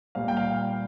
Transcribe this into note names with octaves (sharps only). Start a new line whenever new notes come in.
A#2 G3 F5
G5
F5